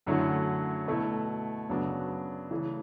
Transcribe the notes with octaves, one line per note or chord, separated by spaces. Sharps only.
F#2 D3 F#3 A3 E4
B2 A3 E4
F#2 C#3 F#3 B3 D4
C#3 E3 A3